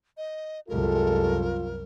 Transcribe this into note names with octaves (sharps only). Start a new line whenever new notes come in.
D#5
C2 F#2 G#3 F4 G4 A4 A#4